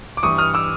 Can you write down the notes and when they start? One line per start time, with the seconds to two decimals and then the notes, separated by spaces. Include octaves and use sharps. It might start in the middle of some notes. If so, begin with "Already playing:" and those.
0.17 D6
0.23 G2 E3 G3 C#6 D#6
0.38 D#6 F6
0.54 D6 E6